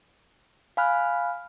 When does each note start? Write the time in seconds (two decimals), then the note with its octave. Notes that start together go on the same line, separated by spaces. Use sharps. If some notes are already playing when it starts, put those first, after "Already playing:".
0.77 F5 G#5 B5 F6 F#6